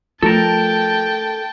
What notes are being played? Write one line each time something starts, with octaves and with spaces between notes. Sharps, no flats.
F3 A3 A4 A#4 G5 A5